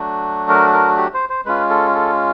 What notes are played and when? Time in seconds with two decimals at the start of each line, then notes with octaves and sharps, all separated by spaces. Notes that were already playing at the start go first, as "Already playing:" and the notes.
Already playing: F#3 A3 D4 F#4
0.49 A#4
0.73 A#4
0.97 G4
1.14 C5
1.30 C5
1.45 G#3 C#4 F4 B4
1.70 A4
1.95 A4